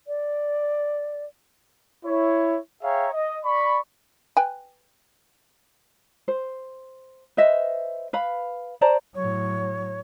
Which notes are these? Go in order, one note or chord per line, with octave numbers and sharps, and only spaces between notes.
D5
E4 C#5
G#4 C#5 E5 F5 G5 A#5
D#5
D5 B5 C#6
B4 G5 G#5
C5
B4 C5 D#5 E5
B4 F5 B5
C5 D5 A5 A#5
A2 F#3 C#5